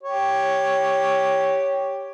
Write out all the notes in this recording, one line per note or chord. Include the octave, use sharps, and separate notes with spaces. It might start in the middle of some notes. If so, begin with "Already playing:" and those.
G4 C#5